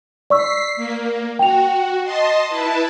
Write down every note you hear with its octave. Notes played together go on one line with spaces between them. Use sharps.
D5 C#6 E6 B6 C7
A#3
F#4 G5 F7
D#5 A5 C6
E4 B4 A5